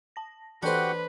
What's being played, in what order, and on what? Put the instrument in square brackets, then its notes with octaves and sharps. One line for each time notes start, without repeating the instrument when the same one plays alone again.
[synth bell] A5 A#6
[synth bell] E3 A4 [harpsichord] D4 C5 [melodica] F#4 G4 F#5 [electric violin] B4